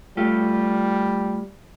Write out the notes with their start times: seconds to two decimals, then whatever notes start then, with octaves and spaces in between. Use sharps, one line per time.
0.17 G3 A3 F4 G4